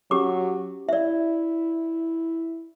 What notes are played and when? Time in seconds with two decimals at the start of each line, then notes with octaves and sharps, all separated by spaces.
0.11 F#3 C#4 G4 D6
0.89 E4 D5 E5